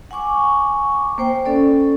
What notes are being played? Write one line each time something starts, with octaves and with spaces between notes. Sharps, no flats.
F#5 G#5 C#6 D6
A#3 C5 G5
C#4 A4 D5